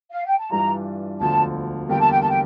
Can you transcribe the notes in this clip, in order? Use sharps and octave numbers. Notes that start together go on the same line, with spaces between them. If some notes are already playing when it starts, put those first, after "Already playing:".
F5
G5
A5
G2 E3 G3 D4 F4 A#5
E1 D2 D3 F3 A5
E2 D3 G3 A#3 G5
A5
G5
A5
G5